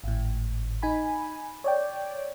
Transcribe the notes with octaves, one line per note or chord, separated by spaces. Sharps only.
G#1 A2
D#4 G#5 B5
C#5 D5 G5